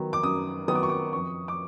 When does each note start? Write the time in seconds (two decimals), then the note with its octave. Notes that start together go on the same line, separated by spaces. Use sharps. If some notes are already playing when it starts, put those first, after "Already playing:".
Already playing: D#3 F#3 B3
0.13 D6
0.23 F#2 D#6
0.68 D#3 F#3 B3 D#6
0.75 D6
0.83 C#6
0.90 D6
1.13 F2 C#6
1.48 D6